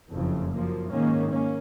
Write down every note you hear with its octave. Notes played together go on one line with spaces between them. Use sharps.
F#1 F2 C#3 F3
F#2 F3 A#3
G#2 D#3 A#3 C#4
A#3 C#4